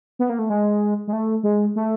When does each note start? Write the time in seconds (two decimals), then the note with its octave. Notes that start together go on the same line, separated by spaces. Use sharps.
0.19 B3
0.30 A#3
0.39 A3
0.50 G#3
1.07 G#3
1.13 A3
1.43 G#3
1.76 A3